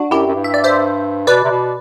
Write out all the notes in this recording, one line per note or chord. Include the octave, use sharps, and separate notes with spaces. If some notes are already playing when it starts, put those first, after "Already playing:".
Already playing: D4 F#4
F#2 E4 G4
F#2
G2
E5
D5
C5 E5
B2 B4 D5
C3
B2